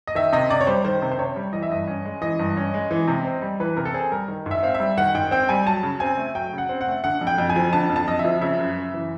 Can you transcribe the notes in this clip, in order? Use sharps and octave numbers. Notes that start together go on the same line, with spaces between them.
D#5
D#3 E5
C3 D#5
C3 D5
C#5
G3 C5
D#3 C5
C3
C5
C3 C#5
G3
E3 D#5
E5
G2 D#5
C#4
G#3
E3 D#5
G2
C#4
G#3
E3
C3
C4
G3
E3 B4
C3 A#4
A4
C4 G#4
G3 A#4
D#3
G#2
E5
C4 F5
E5
G3
D#3 F#5
G#2 G5
C4 G5
G3 G#5
F#3 A5
C#3
C4 G#5
A3
F#3 G5
C#3
F#5
C4
F#5
A3
D3 F#5
F2
G5
F2
G#5
F3
D3 A5
F2
A5
F2 D#5
E5
F3
C#3 E5
F#2
F#2
E3